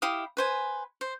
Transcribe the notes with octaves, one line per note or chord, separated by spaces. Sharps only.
E4 G4 F5 D#6
B4 C5 G#5
C5